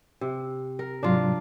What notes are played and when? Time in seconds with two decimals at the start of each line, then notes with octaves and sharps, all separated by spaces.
0.21 C3
0.79 A#4
1.03 G#2 C3 F#3 D4 F4